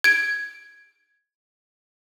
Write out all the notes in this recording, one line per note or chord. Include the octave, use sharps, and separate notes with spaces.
G#6 D7